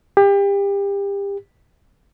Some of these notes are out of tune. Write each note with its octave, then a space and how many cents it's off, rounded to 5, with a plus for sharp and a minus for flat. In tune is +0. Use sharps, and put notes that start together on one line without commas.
G4 +30